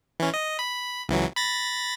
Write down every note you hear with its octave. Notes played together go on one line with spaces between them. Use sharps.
E3 C#4
D#5
B5
C#2 E3 F#3
B5 A6 A#6